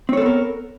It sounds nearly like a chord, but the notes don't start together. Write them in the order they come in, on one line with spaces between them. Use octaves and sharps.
C4 C#5 A4 B3 A#4